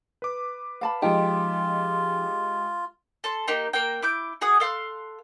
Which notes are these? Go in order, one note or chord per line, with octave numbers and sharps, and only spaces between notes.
B4 D6
F5 A5 B5
F3 G#3 D#4 F4 G4 G5
A4 A5 C6
A#3 D#4 G4
A#3 A#4 G5
E4 D6 G6
F#4 G#4 F#5 D#6
A4 F5 C6 F#6